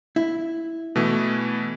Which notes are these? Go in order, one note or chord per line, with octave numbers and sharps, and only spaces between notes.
E4
B2 E3 A3